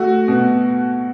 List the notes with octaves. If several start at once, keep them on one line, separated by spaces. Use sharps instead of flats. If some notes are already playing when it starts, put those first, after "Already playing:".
Already playing: A3 F#4
B2